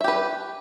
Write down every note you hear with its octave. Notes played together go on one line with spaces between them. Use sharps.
G4 B4 E5